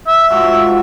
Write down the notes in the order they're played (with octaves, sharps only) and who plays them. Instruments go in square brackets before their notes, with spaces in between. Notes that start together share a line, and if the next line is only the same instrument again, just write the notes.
[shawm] E5
[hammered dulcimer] G#2 F3 F#4